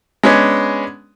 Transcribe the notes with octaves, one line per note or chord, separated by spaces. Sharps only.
G#3 B3 C#4 D4